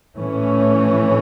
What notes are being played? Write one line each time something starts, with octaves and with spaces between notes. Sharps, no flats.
A2 E3 A3 C#4